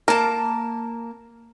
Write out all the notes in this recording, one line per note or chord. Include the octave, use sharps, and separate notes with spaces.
A#3 A#4 A5